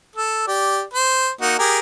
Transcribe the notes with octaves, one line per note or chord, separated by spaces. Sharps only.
A4
G4 D5
C5
A#3 D#4 F#4
G4 G#4 A#4